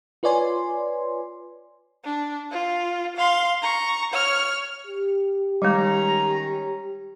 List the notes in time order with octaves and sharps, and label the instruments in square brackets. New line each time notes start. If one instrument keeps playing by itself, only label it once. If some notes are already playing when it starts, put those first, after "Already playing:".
[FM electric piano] F4 B4 C#5 D5 G#5 C6
[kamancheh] D4
F4
F5 C6
A#5 C#6
C#5 F6
[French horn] G4
[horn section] D#3 C#4 A#5 [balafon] G3 G#3